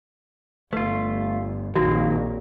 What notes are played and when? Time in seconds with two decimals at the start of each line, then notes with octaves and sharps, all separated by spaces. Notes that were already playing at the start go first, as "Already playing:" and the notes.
0.73 G1 A3 F4 B4
1.75 A#1 F2 D#3 F#3 A#3 F#4